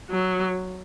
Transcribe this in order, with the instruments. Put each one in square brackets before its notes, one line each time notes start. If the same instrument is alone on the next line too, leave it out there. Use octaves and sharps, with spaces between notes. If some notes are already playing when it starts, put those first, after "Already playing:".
[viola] F#3